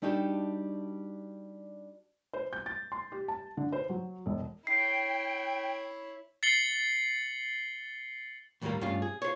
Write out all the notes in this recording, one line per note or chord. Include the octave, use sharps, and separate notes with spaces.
G3 D4 D#4 F#4 G4 A4
C5
G6
A6
C6
G4
A5
D3
C5
F#3
E1
E4 C#5 G5 C7
A6 C7 C#7 F#7 G7
D#2 A2 D#3 F3 G3 A#3
G2 A3 C#4 F4 F5
G#4
F4 G#4 C5 C#5